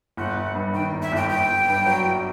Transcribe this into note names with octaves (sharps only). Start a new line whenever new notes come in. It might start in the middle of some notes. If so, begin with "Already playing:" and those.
G1 F#5
G1
G2
D#3 G5
G1
E5
G1 G5
G1 G5
G1
G2
F#3
G1